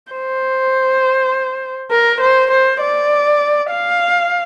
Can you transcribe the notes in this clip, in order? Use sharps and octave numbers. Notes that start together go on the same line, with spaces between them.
C5
A#4
C5
C5
D5
F5